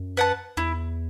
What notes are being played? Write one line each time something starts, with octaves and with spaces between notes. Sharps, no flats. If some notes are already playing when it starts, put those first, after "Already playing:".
Already playing: F#2
B4 F#5 A5
E2 E4